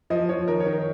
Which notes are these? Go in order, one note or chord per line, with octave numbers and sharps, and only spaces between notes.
F3 D#5
F3 C#5
D#3 A#4
C#5
D#3
A#4